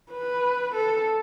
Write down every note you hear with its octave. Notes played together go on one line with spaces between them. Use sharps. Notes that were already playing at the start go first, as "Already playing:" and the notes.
B4
A4